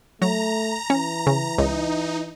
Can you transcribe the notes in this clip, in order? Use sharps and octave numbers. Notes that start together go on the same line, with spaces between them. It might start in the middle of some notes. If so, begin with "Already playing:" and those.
F#3 A3 A#5
E3 C#4
C#3
C#2 D#4